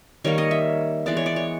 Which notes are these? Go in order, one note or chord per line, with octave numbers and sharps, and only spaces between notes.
D#3 G3 A#3 C#5
D#5
E5
E3 G#3 B3 D5
C#5
D5
C#5